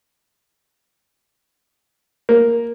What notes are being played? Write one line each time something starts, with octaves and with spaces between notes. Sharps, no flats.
A#3